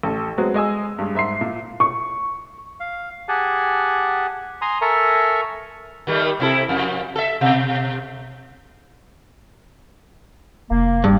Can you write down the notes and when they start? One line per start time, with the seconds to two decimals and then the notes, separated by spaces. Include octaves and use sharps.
0.03 A1 A4
0.38 F#3 G#3 B3 C4 F#4
0.54 G#3 D#5 G#5 E6
0.99 G2 G#3
1.15 G#2 E5 C6 C7
1.41 A#2
1.80 C#6
2.80 F5
3.28 G4 G#4 F#5 G#5 A5
4.62 G#5 A#5 C6 D#6
4.81 A4 A#4 E5 G#5 A#5 C#6
6.07 D#3 G3 A3
6.40 C3 E4 A4
6.69 F2
7.16 A4 E5
7.41 B2
10.71 F1 A#3
11.04 G2